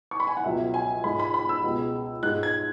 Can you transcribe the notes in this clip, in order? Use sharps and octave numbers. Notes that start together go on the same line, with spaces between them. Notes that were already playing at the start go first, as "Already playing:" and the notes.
C#6
B5
G#5
F#5
C#2 B2 F#3 E5
G#5
G#2 G#3 B5
B5
B5
E6
C#2 B2 G#3
G#2 G#3 F#6
G#6